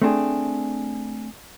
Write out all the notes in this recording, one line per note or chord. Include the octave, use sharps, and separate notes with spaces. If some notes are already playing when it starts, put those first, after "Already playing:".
A3 C4 D4 G#4